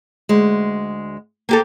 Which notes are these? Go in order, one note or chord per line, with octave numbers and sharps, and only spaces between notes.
D2 G#3
A#3 G4 A4